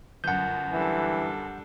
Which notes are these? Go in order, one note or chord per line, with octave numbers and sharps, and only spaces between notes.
G1 F#2 F#5 G6
E3 G3 D4 A4